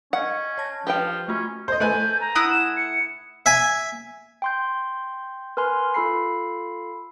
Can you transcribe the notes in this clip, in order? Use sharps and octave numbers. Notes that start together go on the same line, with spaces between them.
C#4 D#5 F#5
C#5 A5 A#6
F3 G4 B4 G5 G7
A3 C#4 F4 F#4
C5 D#5 G6
A3 B4 G#5
A#5
E4 F#5 D#6
E7
C#7
E5 G#5
G5 C6 G6
A#4 B4 G#5 C6 F6
F4 A4 B5 C7